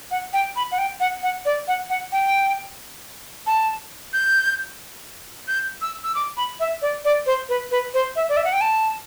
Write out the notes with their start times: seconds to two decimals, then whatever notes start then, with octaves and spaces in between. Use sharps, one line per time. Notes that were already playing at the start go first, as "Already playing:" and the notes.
0.11 F#5
0.33 G5
0.56 B5
0.72 F#5
0.78 G5
1.00 F#5
1.23 F#5
1.45 D5
1.68 F#5
1.90 F#5
2.12 G5
3.47 A5
4.13 G6
5.48 G6
5.82 E6
6.04 E6
6.15 D6
6.37 B5
6.60 E5
6.82 D5
7.05 D5
7.26 C5
7.49 B4
7.71 B4
7.94 C5
8.16 E5
8.29 D5
8.37 E5
8.44 F#5
8.53 G5
8.61 A5